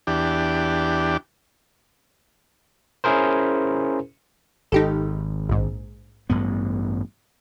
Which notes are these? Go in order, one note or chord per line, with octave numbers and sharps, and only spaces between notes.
E2 D4 G4
C#4 E4 G#4 A#4 C5
G#1 D#4 G4 A4
A#1 G#2
A1 G2 B3